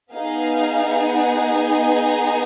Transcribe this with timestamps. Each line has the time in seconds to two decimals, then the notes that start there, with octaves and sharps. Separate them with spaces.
0.12 B3 D#4 G#4 F5
1.07 F#5
1.55 G#5
2.02 A#5